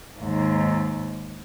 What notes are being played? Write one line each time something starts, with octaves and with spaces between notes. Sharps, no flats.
D#2 G#2